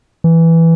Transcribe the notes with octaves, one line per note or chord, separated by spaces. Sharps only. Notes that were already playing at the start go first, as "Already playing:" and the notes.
E3